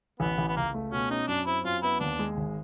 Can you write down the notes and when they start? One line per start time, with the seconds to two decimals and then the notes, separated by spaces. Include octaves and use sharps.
0.20 A1 B3
0.38 A1
0.48 B3
0.56 C#2 A#3
0.74 A3
0.92 B2 C#4
1.10 C#4 D#4
1.28 F#2 D4
1.46 C4 E4
1.64 F#2 F4
1.83 B3 E4
2.00 D#2 D4
2.19 G#3
2.37 G#1